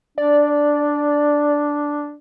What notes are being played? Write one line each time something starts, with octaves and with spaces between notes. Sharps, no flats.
D4 D5